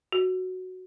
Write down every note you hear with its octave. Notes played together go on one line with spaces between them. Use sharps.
F#4